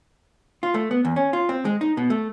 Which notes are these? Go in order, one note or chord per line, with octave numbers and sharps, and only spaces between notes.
F4
A3
B3
E2
C#4
F4
C4
G#3
D#4
B2
A3